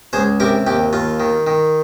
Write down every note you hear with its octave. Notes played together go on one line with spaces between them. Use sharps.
C#2 G#4 C5
C3 G4 A#4
D#2 G4
D#2 F4
D#3
D#3